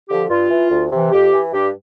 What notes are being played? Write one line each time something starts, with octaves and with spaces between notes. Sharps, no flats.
D3 F3 G4
G2 F4
E3
D2
C3 E3
F2 G4
E3
G2 G4